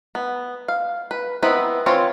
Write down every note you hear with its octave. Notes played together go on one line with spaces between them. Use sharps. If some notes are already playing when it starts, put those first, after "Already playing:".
B3
F5
B4
B3 C4 D#4 E4 B4
E3 C4 F4 C#5